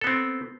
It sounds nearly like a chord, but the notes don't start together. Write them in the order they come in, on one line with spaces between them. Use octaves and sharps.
A4 B3 C4